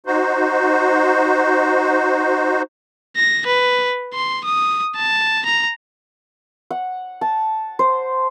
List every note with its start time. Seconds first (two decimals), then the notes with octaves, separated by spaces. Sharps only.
0.07 D#4 F#4 C5
3.16 A#6
3.46 B4
4.14 C6
4.45 D#6
4.96 A5
5.45 A#5
6.71 F#5
7.21 A5
7.79 C5